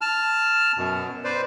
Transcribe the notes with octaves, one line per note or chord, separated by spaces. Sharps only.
A5 F6
F#2 B2
B4 C5 D5